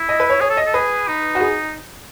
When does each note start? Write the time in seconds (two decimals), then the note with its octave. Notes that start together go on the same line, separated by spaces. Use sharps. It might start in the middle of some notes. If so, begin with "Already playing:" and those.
Already playing: E4
0.09 D#5
0.20 B4
0.30 C#5
0.41 G#4 C#5
0.50 A4
0.57 D#5
0.67 A4
0.74 G#4 B4
1.08 D#4
1.35 F#4
1.40 G#4